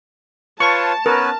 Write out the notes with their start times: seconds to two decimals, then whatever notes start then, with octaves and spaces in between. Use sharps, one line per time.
0.60 F4 B4 C#5 A5 C#6
1.06 B3 C#4 A#4 B4